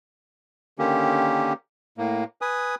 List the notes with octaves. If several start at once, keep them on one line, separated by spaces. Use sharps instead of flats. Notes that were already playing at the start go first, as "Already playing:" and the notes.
D3 D#3 A#3 C#4 G4
A2 A#3
B4 G#5 D#6